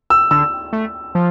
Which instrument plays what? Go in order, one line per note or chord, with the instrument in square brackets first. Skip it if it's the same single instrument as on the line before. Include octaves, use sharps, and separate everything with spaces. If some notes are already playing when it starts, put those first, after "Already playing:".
[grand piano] E6
[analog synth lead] D3 [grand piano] E6
[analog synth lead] A3
F3